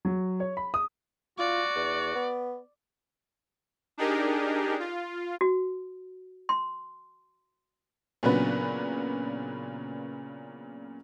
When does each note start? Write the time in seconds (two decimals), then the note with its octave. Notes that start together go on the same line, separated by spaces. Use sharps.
0.05 F#3
0.40 C#5
0.57 B5
0.74 D#6
1.39 F4 F#4 D5
1.76 E2
2.15 B3
3.98 D4 D#4 G4 G#4 A#4
4.79 F4
5.41 F#4
6.49 C6
8.23 A#2 C#3 F#3 B3 D4 B4